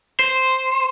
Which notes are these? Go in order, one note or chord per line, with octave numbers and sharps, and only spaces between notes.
C5